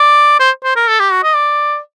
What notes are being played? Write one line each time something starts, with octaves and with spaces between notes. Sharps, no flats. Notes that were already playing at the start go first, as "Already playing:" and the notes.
Already playing: D5
C5
C5
A#4
A4
G4
F#4
D#5
D5